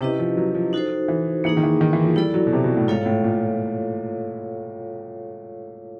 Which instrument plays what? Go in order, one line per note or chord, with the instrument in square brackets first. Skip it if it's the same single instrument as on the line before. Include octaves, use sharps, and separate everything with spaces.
[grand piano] C3 [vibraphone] C#4 E4 G4 B4 D#5
[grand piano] F3
F#3
F3
[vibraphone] D#4 F#4 A4 C5
[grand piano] E3
[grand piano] E3 [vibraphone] A#3 D#4 G#4
[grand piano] D#3
E3
D#3
E3
F3
[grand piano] G3 [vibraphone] E4 A4 D5
[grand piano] F#3
B2
C3
B2
A2
[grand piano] G#2 [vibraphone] F4 A4 C#5 F5
[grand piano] A2
A#2